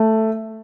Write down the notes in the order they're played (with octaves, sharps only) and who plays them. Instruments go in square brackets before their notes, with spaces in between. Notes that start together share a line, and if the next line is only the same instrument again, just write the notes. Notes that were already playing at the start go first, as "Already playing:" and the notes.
Already playing: [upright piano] A3